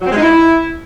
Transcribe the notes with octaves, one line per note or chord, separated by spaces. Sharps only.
F#3
C4
G#3
D#4
E4